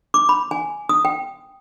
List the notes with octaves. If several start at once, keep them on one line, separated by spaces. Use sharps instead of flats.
D6
B5
G#5
D#6
G5